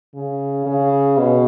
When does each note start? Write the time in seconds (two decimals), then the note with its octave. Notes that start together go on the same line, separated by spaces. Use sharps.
0.14 C#3
0.66 C#3
1.17 B2